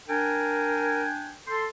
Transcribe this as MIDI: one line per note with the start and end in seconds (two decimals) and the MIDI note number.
0.09 1.37 62
0.09 1.06 70
0.09 1.37 79
0.09 1.37 80
1.48 1.67 69
1.48 1.65 84